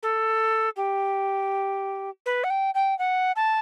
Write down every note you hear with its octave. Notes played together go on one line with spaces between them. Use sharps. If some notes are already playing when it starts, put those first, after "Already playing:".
A4
G4
B4
F#5
G5
G5
F#5
A5